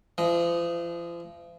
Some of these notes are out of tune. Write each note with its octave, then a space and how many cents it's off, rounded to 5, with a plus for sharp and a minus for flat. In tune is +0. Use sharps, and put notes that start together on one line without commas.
F3 -40 D#5 +0